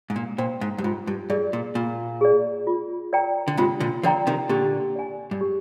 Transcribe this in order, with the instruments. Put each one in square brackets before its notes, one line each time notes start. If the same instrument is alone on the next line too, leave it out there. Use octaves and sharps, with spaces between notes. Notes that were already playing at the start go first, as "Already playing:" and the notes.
[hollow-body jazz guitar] G#2
A#2
[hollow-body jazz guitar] A#2 [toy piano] C5 G5 C6
[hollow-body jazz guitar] G#2
G2
[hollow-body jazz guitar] G#2 [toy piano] F4
[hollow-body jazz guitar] G2
[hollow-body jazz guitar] G2 [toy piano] G#4 D5
[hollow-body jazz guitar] A#2
[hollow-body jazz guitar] A#2 [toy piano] F4
[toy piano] G#4 D5
F4
A#4 D5 G5 A#5
[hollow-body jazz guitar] D3
[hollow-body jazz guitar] G#2 C3 [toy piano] F4
[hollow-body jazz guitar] A#2 D3
[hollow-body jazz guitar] D3 F3 [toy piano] A#4 D5 G5 A#5
[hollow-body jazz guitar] C3 D#3
[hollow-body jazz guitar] A#2 D3 [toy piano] G4
[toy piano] D5 G#5
[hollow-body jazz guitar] G2
[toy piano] G4